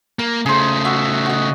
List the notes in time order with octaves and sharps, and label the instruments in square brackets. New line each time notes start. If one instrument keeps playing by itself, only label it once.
[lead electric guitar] A#3 [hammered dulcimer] A#5
[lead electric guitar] C#3 A3 [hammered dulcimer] G#4 C5
[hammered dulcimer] F#4 E5
F#4 D#5